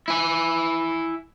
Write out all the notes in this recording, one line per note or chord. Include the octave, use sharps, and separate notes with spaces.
E4 G#5